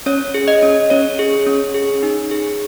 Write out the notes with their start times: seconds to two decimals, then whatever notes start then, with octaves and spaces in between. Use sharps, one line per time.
0.06 C#4 C#5
0.34 G#4
0.48 D#5
0.62 C#4
0.90 C#4 C#5
1.19 G#4
1.47 C#4
1.75 G#4
2.03 D#4
2.31 G#4